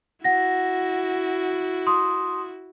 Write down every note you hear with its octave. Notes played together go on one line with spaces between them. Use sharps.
E4 F#4 F#5 A#6
C6 D#6